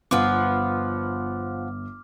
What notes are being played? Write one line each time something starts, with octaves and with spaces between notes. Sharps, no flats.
G1 F3 B3 F4 D6 F6